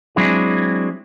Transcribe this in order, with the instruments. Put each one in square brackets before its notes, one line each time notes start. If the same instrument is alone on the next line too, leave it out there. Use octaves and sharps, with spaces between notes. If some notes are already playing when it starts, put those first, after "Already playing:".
[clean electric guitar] F#3 G#3 C4 D4 E4 G#4